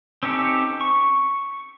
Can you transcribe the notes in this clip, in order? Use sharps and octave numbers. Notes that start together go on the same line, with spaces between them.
C4 C#4 D#4 G4 A4
C#6